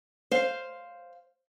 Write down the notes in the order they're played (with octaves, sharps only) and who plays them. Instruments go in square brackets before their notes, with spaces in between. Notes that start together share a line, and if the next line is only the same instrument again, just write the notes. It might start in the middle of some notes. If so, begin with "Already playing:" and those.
[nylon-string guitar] C5 F5